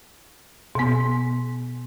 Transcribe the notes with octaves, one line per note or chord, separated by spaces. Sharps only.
B2 B3